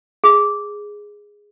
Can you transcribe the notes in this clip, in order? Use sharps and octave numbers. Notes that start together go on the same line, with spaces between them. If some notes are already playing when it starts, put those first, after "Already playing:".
G#4